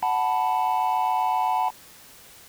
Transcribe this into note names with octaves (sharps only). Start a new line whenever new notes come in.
F#5 A5 B5